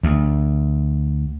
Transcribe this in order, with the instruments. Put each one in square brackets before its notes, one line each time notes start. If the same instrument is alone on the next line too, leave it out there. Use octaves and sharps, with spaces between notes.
[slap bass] D2